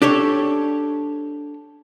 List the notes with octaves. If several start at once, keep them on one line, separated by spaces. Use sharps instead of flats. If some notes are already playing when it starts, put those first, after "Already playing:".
D4 G4 A4 C#5